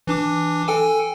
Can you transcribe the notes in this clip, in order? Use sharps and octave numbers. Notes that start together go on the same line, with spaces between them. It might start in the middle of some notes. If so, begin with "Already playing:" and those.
E3 D4 D6
A4 G5 G#5